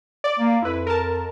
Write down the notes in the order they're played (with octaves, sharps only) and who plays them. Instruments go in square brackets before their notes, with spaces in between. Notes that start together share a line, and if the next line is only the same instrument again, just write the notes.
[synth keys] D5
[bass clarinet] A#3
[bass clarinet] F2 [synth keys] E4 B4
[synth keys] A#4 A5